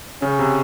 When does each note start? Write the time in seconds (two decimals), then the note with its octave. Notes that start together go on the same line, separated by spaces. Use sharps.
0.22 C#3 C#4
0.39 C3